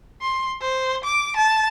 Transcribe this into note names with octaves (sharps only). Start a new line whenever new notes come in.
C6
C5
D6
A5